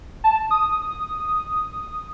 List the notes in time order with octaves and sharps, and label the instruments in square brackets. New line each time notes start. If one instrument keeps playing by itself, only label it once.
[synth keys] A5
D#6